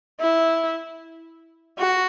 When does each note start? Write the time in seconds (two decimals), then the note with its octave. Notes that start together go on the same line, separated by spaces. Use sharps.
0.20 E4
1.78 F#4